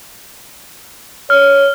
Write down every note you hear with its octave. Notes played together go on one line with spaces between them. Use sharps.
C#5 F6